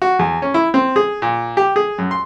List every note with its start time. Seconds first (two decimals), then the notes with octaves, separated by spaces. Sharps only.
0.02 F#4
0.19 E2
0.42 C#4
0.54 E4
0.74 C4
0.96 G#4
1.22 A#2
1.57 G4
1.76 G#4
1.98 F#2
2.11 C6